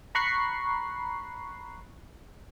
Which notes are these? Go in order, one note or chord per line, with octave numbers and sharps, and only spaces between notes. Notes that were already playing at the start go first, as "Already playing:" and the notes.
A#5 B5 C#6 F#6 C7